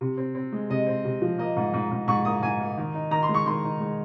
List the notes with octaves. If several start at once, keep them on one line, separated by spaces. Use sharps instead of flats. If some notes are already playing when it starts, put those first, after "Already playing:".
C3
C4
C4
G#3
C3 D#5
C4
C3
F3
A#3 D#5
G#2
G#2
G#2
G#2 C#6
A#3 D#6
G#2 G#5
A#3
D#3
D#4
D#3 A#5
C6
G#3
C#6
D#3 C6
D#4
G#3